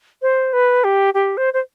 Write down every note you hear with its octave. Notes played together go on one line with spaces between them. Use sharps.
C5
B4
G4
G4
C5
C5